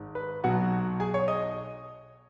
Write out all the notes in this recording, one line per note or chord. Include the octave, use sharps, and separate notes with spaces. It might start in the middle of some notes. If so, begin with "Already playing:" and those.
Already playing: G#1 G#2
B4
B1 B2 F#3 F#4 F#5
G#4 G#5
C#5 C#6
D#5 D#6